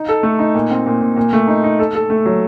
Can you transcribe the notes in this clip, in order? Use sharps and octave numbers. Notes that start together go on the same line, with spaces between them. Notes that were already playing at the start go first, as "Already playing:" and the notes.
Already playing: D#4
A4
A3
D#4
A#2
C4
A#2
A#2
A#2
A3
D#4
D#4
A4
A4
A3
F#3